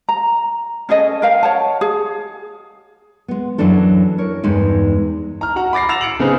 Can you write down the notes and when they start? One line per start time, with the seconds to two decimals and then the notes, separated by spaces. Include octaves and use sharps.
0.09 A#5
0.89 C#4 G#4 A4 D#5
1.22 A#4 F5 G5
1.43 C#5 F#5 A5
1.81 G#4
3.28 G#3 B3
3.58 F#2 E3 F#3 D4 A4
4.18 A#4 C#5
4.44 E2 G2 G#3 D#4
5.41 A#5 F6
5.56 F#4 F#5 A#5
5.73 B5 D6 A6 A#6 C7
5.88 F#5 E6 A6 A#6 E7 F7
6.01 C#7 D7 F#7
6.19 C#3 B3 C4 D#4 G#4 B4